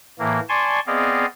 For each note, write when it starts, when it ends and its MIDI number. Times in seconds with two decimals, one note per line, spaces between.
0.19 0.40 45
0.19 0.40 52
0.19 0.40 58
0.49 0.80 74
0.49 0.80 80
0.49 0.80 81
0.49 0.80 84
0.49 0.80 85
0.87 1.25 59
0.87 1.25 60
0.87 1.25 68
0.87 1.25 74
0.87 1.25 75
0.87 1.25 77